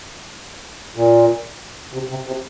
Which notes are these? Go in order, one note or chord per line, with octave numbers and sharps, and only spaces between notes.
A#2
C3
C3
C3